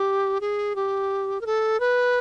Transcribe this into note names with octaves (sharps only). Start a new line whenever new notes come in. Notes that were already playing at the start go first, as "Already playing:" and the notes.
Already playing: G4
G#4
G4
A#4
A4
B4